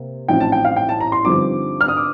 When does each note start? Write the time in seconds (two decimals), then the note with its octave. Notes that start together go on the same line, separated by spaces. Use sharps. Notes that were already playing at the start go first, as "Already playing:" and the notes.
Already playing: C3 A#3
0.28 A1 A2 F3 C4 D#4 G5
0.40 A5
0.52 G5
0.65 F5
0.76 G5
0.89 A5
1.01 A#5
1.12 C6
1.25 G2 D3 F3 C4 D#4 D6
1.81 F6
1.88 D#6
1.97 D6